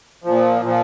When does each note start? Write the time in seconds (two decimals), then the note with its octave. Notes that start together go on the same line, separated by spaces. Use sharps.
0.24 A#2 F3
0.62 A#2 F3